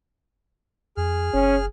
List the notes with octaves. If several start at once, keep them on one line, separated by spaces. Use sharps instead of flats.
F2 G#4 F6
F#1 C#4